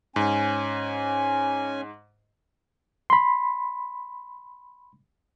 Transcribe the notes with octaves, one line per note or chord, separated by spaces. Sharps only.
G#2 C#4 G#5
B5 C6